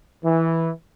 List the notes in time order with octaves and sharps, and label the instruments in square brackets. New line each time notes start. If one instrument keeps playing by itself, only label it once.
[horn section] E3